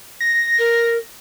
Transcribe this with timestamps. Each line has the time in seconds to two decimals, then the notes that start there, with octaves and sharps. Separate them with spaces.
0.21 A#6
0.59 A#4